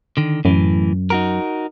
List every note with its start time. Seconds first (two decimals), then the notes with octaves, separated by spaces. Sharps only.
0.17 D3 D#3
0.45 F#2 A2 E3
1.10 D#4 F#4 A#4